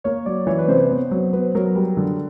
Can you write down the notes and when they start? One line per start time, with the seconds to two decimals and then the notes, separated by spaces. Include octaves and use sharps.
0.04 A#3 C#5
0.26 F#3 D5
0.47 E3 C#5
0.58 B4
0.68 C3 C5
0.90 B3
1.11 F#3
1.33 B3 B4
1.55 F#3 A#4
1.75 G3 A#4
1.97 D3